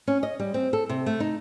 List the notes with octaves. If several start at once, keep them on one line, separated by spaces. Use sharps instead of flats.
C#4
D#5
G3
C4
A4
C3
A3
D#4